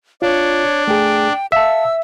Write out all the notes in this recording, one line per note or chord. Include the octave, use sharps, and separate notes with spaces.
D4 F4 C#5
A3 G#4 G5
E5 F5 A5 E6